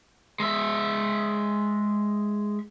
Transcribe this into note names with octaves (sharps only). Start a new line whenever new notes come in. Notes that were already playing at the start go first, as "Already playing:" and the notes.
G#3 E5